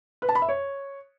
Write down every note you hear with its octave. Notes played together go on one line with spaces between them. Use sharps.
B4
A5
B5
E5
C#5